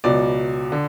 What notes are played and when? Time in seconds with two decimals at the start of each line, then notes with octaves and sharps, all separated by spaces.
0.04 C#2 B2 F#3 D5
0.72 D3